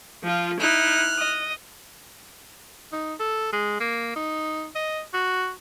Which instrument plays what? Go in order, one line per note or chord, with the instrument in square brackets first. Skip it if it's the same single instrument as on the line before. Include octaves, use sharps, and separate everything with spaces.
[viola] F3 F4
[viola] D#4 E4 [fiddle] F6 F#6
[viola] D#5
[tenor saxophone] D#4
A4
G#3
A#3
D#4
D#5
F#4